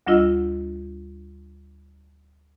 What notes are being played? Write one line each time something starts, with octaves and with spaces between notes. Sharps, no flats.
D2 G3 D4 F4 D#5 E6